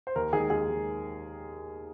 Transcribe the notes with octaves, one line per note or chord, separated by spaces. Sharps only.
C5
D#2 A#4
D#3 G#3 G#4
D#2 G#4
D#3 G#3